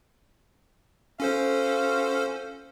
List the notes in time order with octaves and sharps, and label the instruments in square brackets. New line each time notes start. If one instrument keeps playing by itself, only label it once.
[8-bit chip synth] C#4 A4 C5 [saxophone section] F4 F#4 F5